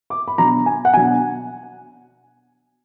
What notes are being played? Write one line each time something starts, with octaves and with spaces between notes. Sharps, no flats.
D6
B5
B2 F#3 D4 A#5
G#5
F#5
B2 F#3 D4 G#5